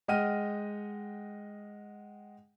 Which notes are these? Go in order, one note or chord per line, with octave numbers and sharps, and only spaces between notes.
G#3 D#5 F#5 G5 F6 D#7